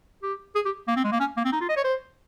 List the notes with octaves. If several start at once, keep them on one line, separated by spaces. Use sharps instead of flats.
G4
G#4
G4
A#3
C4
G#3
A#3
C#4
A#3
C4
D#4
F4
D#5
C#5
C5